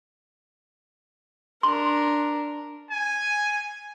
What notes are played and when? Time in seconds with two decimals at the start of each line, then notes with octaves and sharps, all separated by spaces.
1.63 D4 A#4 C6
2.91 G#5